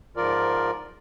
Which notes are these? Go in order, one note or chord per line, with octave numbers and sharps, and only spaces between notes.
G#2 F3 F4 A#4 D5